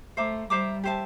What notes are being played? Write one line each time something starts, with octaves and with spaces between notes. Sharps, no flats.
A3 C5 E5 A#5 D6
G3 C5 E5 A#5 D6
G4 C5 E5 A5